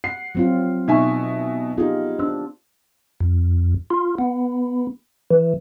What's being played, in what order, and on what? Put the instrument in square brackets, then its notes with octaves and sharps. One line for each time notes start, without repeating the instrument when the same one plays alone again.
[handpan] F#5 [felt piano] C7
[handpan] F#3 C4 F4
[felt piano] B2 E5 G#5 [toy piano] D#4 C#6
[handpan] B3 F4 G4 [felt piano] D#4 G#4
[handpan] D4 [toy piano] C5 C6 E6
[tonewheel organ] F2
F4
B3
E3